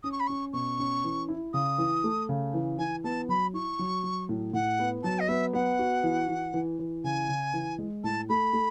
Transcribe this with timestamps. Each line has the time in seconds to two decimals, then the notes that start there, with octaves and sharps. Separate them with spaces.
0.03 C#4 D#6
0.12 C#6
0.20 B5
0.27 C#4 C#6
0.53 B2 C#6
0.79 C#4
1.04 E3
1.29 E4
1.54 C#3 D#6
1.78 E3
2.04 A3
2.29 C#3
2.54 E3
2.78 E3 G#5
3.04 B3 A5
3.29 F#3 B5
3.54 E4 C#6
3.79 F#3
4.04 F#3
4.29 A2
4.53 A2 F#5
4.79 B3
5.03 F#3 A5
5.20 D#5
5.28 B3 E5
5.53 B3 F#5
5.79 F#4
6.03 E3
6.28 E3
6.54 E3
6.79 E3
7.04 C#3 G#5
7.28 C#3
7.54 E3
7.78 G#3
8.04 A2 A5
8.29 A3 B5
8.53 A3